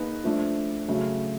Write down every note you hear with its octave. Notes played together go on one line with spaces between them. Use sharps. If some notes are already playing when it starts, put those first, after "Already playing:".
Already playing: A#3 D#4 G#4 B4
F3 A3 D4
C#3 F#3 A3